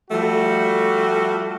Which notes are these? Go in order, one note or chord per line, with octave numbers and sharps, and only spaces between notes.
F3 G3 A3 F#4